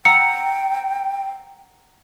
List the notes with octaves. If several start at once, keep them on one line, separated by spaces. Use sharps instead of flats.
F#5 G5 A#5 E6 C#7